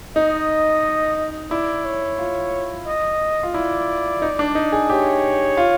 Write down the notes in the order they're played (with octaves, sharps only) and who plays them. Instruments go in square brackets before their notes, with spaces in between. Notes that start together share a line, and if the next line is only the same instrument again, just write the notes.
[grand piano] D#4 [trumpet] D#5
[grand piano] E4 [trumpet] D5
[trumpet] C#5
[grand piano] F4
[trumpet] D#5
[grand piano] F4
[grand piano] E4 [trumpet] D5
[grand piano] D#4
D4
D#4
G#4
[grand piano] G4 [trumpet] C#5
[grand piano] F4